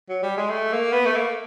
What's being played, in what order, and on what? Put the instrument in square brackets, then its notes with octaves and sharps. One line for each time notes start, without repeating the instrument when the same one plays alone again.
[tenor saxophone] F#3
G3
G#3
A3
A#3
B3
A3
A#3